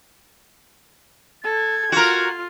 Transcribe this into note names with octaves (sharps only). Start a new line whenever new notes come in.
A4 G#6
F4 F#4 A#4